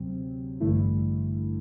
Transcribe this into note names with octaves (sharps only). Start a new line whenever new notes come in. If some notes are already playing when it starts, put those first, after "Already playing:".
Already playing: D2 C3 F#3 C4
A1 G2 D3 A3 E4